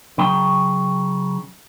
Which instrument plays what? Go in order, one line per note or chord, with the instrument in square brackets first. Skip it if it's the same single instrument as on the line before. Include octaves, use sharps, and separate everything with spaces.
[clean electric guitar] C#3 F#3 G5